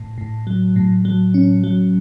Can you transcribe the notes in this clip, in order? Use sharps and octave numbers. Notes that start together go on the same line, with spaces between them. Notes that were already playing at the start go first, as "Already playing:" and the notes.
Already playing: A2
A2
F#3
A2
F#3
C#4
F#3